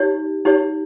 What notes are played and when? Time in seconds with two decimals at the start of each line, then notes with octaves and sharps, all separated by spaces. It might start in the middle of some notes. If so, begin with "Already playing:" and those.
Already playing: D#4 G4 C#5
0.45 D#4 G4 C#5